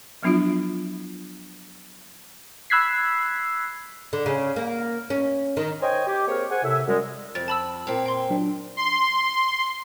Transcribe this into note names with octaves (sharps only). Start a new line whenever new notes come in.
F3 F#3 B3 D4 E4 F4
B5 E6 F#6 G#6 B6 C7
D3
C#3
A#3
C#4
D#3
C5 C#5 D#5 G5 G#5
G4
A#3 C4 G#4 A#4 C#5
G#4 C5 F#5 G#5
A2 C3 E5
F#2 G3 G#3
F2 A6
A5 B5 E6
A#2 C4
G5 C6
F#3 D4
C6